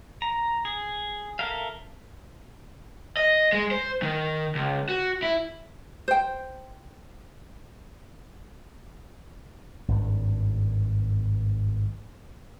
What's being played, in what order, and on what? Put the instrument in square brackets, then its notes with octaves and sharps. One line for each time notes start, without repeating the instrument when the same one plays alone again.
[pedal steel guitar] A#5
G#4
A4 A#4 E5 F5
[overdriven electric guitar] D#5
G#3
C5
D#3
C#2
F#4
E4
[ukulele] C5 G5
[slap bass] G#1 G2